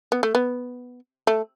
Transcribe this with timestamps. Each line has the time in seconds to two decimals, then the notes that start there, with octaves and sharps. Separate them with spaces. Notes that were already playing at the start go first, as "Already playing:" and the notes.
0.12 B3
0.23 A3
0.35 B3
1.27 A3